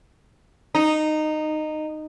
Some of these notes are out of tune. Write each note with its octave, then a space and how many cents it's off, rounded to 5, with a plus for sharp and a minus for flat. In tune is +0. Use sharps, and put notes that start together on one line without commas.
D#4 -15